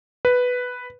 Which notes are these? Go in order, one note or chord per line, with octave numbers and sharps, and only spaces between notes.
B4